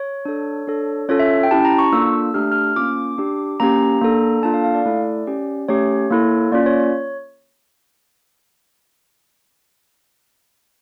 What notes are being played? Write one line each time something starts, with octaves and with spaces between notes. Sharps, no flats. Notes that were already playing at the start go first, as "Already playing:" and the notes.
Already playing: C#5
D4 A4
D4 A4
C#4 F4 A4 C#5
E5
G5
C#4 E4 G4 A5
A#5
C#6
A#3 D4 F4 A4 E6
A3 D4 G4 F6
F6
A#3 C#4 F4 D6
D4 G4
A#3 C#4 G4 A#5
A#3 D4 A4
A#3 D4 F4 A4 A5
F5
F5
D5
A3 E4 A4
C#4 G4
A3 C#4 G4 C#5
A#3 E4 A4
A#3 C#4 F4 D5
C#5
C#5